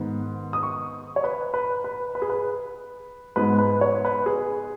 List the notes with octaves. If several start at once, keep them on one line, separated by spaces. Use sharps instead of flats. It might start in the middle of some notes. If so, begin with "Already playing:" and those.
Already playing: G#2 D#3 B3
D#6
C#6
C#5
B4
B4
B4
B4
G#4
B4
G#2 G#3 B3 B4
B4
C#5
B4
G#4